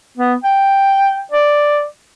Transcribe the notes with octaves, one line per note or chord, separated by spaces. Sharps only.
B3
G5
D5